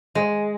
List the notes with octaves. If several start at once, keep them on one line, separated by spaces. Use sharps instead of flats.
G#3